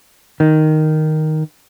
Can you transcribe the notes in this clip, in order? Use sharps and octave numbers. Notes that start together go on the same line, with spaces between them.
D#3